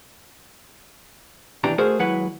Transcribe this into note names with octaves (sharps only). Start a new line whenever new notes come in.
D#2 B2 E3 D4 G4 A#5
A3 F#4 G#4 A#4 C5
D#2 F#3 G#3 E4 B4 F#5